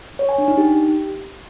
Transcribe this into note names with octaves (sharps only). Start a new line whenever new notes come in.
C#5
G#5
D4
D#4
G4